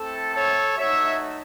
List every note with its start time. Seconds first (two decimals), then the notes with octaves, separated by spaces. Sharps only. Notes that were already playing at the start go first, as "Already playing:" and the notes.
Already playing: A3 C4 E4 A4
0.34 A4 C#5
0.76 A3 D#4 F#4 C#5 E5